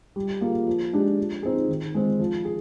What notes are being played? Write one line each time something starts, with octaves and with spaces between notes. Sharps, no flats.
G3
A#3 F4 G#4
F3
G#3 D4 G4
F3
C4 D#4 G#4
D#3
G#3 C4
F3
G#4